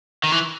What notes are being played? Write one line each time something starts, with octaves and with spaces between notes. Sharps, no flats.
D#3
E3